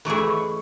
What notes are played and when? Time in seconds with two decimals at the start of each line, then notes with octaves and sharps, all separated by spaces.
0.05 E3 A3 E4 G#4 C#6
0.16 B5
0.28 C#6